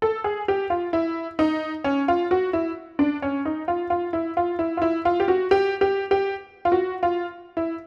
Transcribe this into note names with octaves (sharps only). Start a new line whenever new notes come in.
A4
G#4
G4
F4
E4
D#4
C#4
F4
F#4
E4
D4
C#4
D#4
F4
F4
E4
F4
E4
F4
E4
F4
G4
F#4
G4
G4
G4
F4
F#4
F4
E4